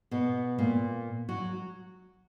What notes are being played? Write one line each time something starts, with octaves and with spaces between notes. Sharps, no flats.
B2 B3
A#2 A#3
F#3 F#4